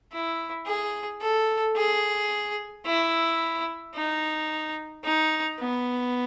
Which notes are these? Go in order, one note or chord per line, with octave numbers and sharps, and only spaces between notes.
E4
G#4
A4
G#4
E4
D#4
D#4
B3